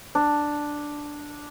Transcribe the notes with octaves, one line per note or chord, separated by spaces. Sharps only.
D4